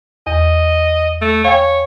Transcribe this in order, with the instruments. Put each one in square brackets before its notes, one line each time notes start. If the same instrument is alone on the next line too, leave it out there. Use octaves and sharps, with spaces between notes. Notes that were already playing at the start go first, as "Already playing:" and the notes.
[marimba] E2 [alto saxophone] D#5
[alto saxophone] A3
[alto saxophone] C#5 [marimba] F5 G5 G#5